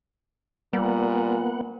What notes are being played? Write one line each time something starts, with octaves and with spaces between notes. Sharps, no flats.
A#2 G3 A#3 B3 F#5